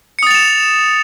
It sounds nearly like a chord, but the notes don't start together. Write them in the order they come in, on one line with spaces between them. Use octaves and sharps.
C#7 D#6 A6 F7 E7